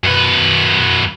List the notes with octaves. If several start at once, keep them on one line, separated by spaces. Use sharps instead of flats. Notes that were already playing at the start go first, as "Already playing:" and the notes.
F#2 B4